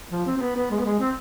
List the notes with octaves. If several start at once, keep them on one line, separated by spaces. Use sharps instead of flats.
F3
C4
C4
B3
B3
G#3
B3
G#3
C4